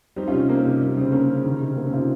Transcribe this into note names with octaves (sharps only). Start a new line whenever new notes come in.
G3 C4 D#4
C#4 F4
C3
C#4
A#3 C4 D#4
C3
G3
C#3 C4
A#3 C#4
C#3
D#3
C3
A#3 C4
C#4
C3 F4
C4 D#4